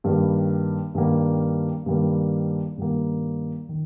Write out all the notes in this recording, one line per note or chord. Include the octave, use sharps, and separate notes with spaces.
G2 D#3 G3 A#3
G2 D#3 G3 A#3
G2 D#3 G3 A#3
G2 D#3 G3 A#3
D#3